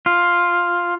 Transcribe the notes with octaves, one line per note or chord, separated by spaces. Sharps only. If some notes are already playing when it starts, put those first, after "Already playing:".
F4